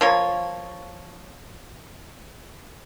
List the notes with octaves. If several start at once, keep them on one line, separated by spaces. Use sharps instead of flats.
F3 A#3 C#5